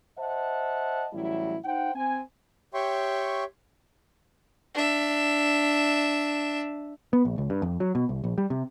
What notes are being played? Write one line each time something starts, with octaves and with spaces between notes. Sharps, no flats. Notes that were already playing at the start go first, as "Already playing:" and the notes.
C5 D#5 E5 F#5 A5
A1 F#3 G3 E4
D#4 C5 F#5 G5
C4 G#5
G4 C#5 E5 G5 C6 C#6
D4 E5
B3
A#1
C#2
G2
F2
F#3
B2
C2
A#1
G3
C3